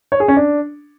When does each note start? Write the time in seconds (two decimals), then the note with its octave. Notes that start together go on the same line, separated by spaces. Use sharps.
0.12 C#5
0.20 G#4
0.28 C#4
0.37 D4